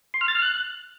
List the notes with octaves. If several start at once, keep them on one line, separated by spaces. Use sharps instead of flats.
C6
F6
A6
F6
F#6